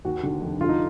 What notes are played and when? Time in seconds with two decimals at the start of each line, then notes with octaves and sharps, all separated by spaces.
0.05 D#2 F#4
0.23 D3
0.42 F1
0.61 D3 F4
0.69 D#4